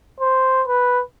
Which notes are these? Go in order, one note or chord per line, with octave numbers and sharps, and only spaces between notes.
C5
B4